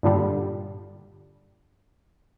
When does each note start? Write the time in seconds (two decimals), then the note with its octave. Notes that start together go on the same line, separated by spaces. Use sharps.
0.03 G2 A#2 D3 G3